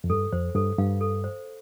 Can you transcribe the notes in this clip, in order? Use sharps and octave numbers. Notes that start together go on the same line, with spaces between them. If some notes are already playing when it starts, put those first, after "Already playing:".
F2
G2 A4
F2 C5
G2 A4
G2 F5
A4
C5